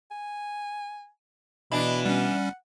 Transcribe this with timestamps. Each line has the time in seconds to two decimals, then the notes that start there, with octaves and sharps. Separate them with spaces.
0.11 G#5
1.72 B2 E3 D4 D#5 B5
2.05 G3 C#4 F#5